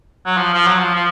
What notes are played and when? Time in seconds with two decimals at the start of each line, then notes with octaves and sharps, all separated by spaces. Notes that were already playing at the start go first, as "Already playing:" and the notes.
0.26 F#3
0.37 F3
0.54 F3
0.67 F#3
0.79 F3
0.95 F3